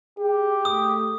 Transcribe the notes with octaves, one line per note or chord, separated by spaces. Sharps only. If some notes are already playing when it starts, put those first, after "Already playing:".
G4 G#4
A3 D#6